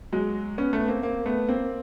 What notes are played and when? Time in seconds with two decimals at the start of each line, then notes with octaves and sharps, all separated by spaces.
0.13 F#3 G#3
0.58 B3 C#4
0.73 A3 B3
0.88 A#3 C4
1.03 A#3 C4
1.26 A3 B3
1.48 A#3 C4